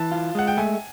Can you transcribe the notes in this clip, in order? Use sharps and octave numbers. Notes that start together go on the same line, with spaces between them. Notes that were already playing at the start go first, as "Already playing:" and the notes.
Already playing: E3 A5
F4
G#3 F#5
G5
A3 G#5